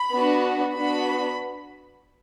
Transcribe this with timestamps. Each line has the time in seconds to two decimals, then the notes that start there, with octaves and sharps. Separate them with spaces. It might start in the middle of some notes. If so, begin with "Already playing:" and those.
Already playing: B5
0.11 B3 D4 F#4
0.74 B3 D4 F#4 B5